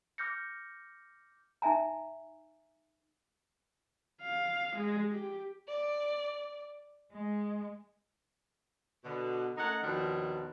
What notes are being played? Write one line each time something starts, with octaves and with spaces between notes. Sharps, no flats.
D6 F6 G6 A#6 C#7
D#4 E5 G#5 A#5
F5
G#3
G4
D5
G#3
B2 D3
A3 C#4 D#4 A#4 F#5
D#2 B2 D#3 F3 F#3 D4